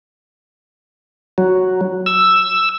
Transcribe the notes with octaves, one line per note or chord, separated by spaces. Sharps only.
F#3
E6